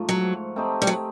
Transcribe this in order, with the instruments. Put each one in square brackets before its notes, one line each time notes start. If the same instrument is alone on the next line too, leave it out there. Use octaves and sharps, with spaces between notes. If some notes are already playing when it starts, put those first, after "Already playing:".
Already playing: [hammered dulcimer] G#2 F3 A3
[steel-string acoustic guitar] F#3
[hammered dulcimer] A3 C4 D#4 G4
[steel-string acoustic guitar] G3
F#3